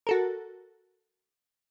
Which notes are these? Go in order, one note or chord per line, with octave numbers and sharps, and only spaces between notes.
F#4 A4 A#4